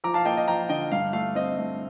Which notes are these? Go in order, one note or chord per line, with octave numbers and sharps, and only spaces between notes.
F3 A#5 D6
F5 A5
A#3 D#5 G5
D#5
F3 G5 A#5
D3 D#5 G5
G2 F5
A3 F5
C4 D#5
A3